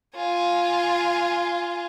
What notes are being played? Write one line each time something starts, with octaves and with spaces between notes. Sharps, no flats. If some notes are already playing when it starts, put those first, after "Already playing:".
F4 G#5